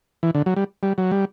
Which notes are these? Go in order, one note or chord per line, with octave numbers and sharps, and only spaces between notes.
E3
D3
F#3
G3
G3
F#3
G3